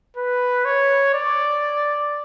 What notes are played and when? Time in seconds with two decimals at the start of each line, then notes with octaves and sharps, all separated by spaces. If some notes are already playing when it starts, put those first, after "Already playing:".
0.17 B4
0.65 C#5
1.14 D5